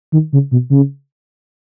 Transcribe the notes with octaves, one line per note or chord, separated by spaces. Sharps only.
D#3
C#3
B2
C#3